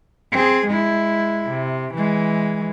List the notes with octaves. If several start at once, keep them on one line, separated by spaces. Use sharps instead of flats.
C4 G#4
G#3 E4
C3
E3 G#3